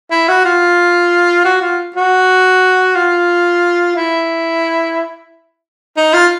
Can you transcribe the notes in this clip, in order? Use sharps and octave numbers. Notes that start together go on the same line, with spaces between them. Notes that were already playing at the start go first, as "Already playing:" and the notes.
E4
F#4
F4
F#4
F4
F#4
F4
E4
D#4
F4